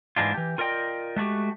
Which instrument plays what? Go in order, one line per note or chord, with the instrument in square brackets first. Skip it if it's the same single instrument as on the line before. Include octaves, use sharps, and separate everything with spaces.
[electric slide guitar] G#2 E3 G#3 D4 F4
E3 G4
F4 A#4 D5 D#5 G5
G#3 A3 F#4 G4